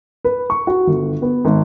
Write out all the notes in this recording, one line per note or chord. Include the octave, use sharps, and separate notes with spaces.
B4
C#6
F#4
G1
B3
G#1